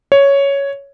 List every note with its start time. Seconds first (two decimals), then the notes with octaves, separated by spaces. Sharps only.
0.12 C#5